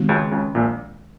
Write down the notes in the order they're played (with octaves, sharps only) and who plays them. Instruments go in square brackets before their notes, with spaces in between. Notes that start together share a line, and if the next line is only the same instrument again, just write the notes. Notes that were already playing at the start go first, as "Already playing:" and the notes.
Already playing: [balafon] D#3 G#3 C4 D#4 F#4
[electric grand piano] C#2 C#3
C#2 C#3
A#1 A#2